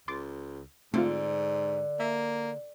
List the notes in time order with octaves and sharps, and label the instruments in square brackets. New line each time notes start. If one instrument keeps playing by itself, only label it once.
[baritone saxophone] C#2 [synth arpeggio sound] C6 D6 A6
[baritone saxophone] G#2 [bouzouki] D3 [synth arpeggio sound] A3 C4 F4
[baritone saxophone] A#3 [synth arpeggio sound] E5